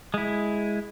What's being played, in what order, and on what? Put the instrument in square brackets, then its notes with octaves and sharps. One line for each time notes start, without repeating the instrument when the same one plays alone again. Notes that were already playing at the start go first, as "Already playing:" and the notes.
[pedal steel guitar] G#3 E4